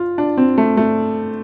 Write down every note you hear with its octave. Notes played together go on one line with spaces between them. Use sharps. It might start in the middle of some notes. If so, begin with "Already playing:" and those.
Already playing: F4
D4
C4
A3
A3